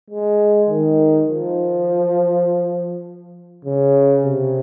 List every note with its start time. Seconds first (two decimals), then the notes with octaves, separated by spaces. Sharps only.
0.10 G#3
0.69 D#3
1.29 F3
3.65 C#3
4.24 C3